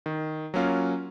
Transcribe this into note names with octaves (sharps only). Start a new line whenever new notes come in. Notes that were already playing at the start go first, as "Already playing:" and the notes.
D#3
F#3 A#3 C#4 F4